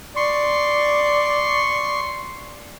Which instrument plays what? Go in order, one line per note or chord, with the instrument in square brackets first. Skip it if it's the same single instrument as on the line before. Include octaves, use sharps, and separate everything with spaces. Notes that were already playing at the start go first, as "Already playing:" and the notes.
[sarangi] D5 [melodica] C6 C#6